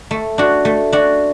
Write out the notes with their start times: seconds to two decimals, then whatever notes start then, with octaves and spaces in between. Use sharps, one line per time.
0.11 A3
0.38 D4 F#4
0.65 A3
0.92 D4 F#4